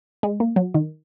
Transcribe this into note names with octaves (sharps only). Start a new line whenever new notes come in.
G#3
A#3
F#3
D#3